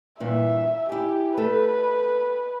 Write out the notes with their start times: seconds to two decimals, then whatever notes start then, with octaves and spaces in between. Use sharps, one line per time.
0.20 G2 A#2 E3 E5
0.89 E4 G4 G#5
1.37 A3 A4 B4